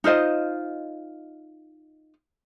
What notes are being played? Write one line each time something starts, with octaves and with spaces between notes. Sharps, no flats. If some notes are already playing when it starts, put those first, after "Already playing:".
D#4 F4 C5 D#5